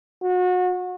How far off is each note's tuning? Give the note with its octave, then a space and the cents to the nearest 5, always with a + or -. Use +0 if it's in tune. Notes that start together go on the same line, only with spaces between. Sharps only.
F#4 -30